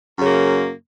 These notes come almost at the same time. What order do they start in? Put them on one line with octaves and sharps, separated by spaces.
F#2 C#3 A#3